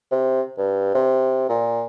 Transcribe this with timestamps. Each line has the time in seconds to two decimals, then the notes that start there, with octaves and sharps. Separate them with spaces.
0.11 C3
0.58 G2
0.94 C3
1.49 A#2